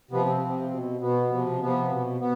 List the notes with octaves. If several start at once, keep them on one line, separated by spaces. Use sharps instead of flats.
C3 F3 B3
C4
C3 F3
B2
B2 B3
C3 F3
C3 F3 B3
B2
B3